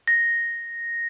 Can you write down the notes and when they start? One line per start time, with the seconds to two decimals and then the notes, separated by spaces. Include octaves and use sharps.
0.08 A#6